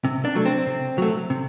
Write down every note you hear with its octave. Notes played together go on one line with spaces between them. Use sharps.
C3
D4
F#3 A3
C4
C3
F#3 A3
C3